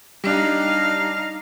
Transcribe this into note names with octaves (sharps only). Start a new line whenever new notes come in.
G3 D4 D#4 F5